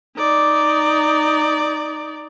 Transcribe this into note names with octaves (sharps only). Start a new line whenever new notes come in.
D#4 D5